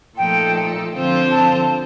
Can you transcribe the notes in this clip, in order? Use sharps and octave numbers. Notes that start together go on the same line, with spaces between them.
A#2 F3 A3 D#4 A4 G5
D3 F3 C4 F4 C5
A5